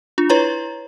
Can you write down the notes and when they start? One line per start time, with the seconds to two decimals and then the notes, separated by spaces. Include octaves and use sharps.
0.18 D4 F4
0.29 E4 B4 C#5 A#5